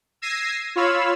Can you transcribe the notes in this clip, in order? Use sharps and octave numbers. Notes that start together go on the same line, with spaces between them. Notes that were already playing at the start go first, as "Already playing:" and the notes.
E6 G#6 A#6 C7 D#7
F4 C#5 F5 B5 E6